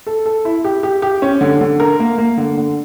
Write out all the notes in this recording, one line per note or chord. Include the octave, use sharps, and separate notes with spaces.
A4
A4
E4
G4
G4
G4
C#4
D3
D3
A#4
A#3
A#3
D3
D3